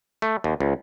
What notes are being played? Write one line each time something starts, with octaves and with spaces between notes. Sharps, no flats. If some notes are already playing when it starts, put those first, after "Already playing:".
A3
D#2
C#2